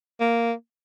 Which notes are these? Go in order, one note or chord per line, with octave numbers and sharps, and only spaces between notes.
A#3